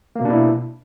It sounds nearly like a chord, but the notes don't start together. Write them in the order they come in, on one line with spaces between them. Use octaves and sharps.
A#3 B2 D4 E4